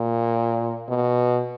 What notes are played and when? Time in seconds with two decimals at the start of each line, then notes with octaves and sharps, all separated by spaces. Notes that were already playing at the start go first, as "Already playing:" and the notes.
Already playing: A#2
0.89 B2